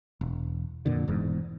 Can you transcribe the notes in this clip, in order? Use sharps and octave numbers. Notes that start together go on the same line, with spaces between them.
E1
F2 A#2 D3
E1 E2 G#2